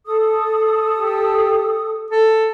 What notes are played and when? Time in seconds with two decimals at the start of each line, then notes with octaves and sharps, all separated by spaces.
0.06 A4 D#6
0.94 G4
2.11 A4